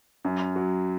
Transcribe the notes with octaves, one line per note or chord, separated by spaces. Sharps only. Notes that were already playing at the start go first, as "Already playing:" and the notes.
F#2
F#3